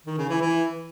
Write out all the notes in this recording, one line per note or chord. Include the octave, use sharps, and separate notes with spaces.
D#3
C#3
E3
E3